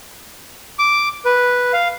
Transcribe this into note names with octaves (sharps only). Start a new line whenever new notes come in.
D6
B4
F5